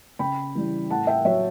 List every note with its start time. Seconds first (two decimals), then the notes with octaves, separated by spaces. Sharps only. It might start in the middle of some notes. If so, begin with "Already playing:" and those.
0.19 C#3 G5 B5
0.55 E3 G3
0.90 A2 F#5 A5
1.07 E5 G5
1.25 F#3 C#5 E5